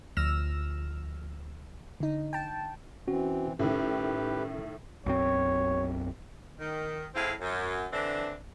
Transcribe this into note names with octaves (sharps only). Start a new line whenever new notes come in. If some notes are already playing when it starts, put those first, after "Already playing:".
D2 F3 E6 F6 A#6 E7
D3 D#4
G5 A5
E3 C4 C#4 F#4
A2 D#3 C#4 G4 B4
B1 F#2 C4 C#5
D#3
A2 C4 E4 G#4 F5
F#2
D3 E3 C4 D4